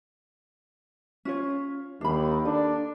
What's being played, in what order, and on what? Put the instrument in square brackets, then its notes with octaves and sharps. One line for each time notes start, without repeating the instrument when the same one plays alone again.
[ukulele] C#4 F4 C#5
[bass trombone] D#2 [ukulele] D4 B5
[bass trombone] D4 [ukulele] A4